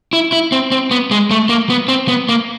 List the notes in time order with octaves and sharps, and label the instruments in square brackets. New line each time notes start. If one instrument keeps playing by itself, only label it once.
[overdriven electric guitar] E4
E4
C4
C4
B3
G#3
A3
A#3
B3
C4
B3
A#3